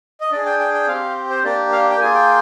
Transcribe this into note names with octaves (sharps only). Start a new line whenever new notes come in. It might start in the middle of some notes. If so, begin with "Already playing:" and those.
D#5
D4 G#4 D5
G5
G5
G5
C4 G4 F5
C5
A#3 D4 G4 D5
F5
G5
A#3 F4 G#4 G#5
G5